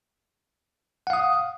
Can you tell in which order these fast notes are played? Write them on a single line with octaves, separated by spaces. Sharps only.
F#5 F5 D#6